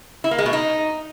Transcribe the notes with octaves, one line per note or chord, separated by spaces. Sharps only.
E4
A#3
G#3
B2
D#4